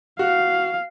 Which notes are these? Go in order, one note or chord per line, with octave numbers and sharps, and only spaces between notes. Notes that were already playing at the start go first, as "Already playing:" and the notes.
F#4 F5